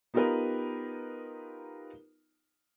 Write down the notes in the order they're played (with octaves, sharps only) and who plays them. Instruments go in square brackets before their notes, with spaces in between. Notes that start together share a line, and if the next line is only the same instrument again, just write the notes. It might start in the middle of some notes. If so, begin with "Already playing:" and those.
[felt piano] B3 D#4 F4 G4 A#4 B4